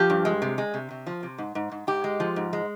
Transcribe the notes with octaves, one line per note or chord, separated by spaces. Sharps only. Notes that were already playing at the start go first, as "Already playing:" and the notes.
Already playing: F3 G4
G2
G#3
C3
G#3
C3
C3
F3
C3
G#2
G#2
G#2
G#2 G4
G#3
F3
G#2
G#3